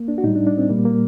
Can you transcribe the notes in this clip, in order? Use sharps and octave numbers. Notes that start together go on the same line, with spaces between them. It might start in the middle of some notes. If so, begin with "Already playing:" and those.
Already playing: A#3
D4
F#4
A2 G3 D#4
D4
D4
C4
A#2 G3 A#3
A#3